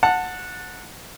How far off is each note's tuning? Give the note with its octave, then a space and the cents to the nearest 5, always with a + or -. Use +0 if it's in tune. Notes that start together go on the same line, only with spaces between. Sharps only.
F#5 -15 A5 +15